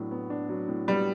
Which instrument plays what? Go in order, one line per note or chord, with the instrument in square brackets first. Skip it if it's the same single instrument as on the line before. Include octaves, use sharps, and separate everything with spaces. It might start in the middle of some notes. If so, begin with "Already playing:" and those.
Already playing: [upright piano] A2 F#3 B3 D4
B3
D4
F#3
A2
[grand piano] G3 [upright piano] B3